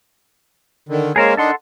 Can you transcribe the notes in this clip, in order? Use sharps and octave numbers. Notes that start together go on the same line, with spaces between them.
D3 D#3
G#3 A#3 C#4 G#4 A#4 C5
D#3 D4 D#4 A4 F#5 C6